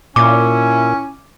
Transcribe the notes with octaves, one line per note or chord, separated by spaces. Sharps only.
A#2 C#4 E4 D6